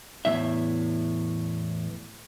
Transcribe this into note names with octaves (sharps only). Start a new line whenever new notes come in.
E2 A2 E5